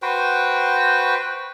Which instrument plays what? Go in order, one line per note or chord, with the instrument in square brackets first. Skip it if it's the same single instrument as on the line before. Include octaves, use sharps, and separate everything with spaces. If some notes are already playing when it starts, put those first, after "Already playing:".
[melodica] F#4 B4 C5 G5